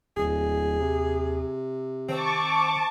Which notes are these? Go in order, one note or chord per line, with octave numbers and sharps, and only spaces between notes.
D1 D#2 G#4
C3
D#3 C4 A5 C#6 D6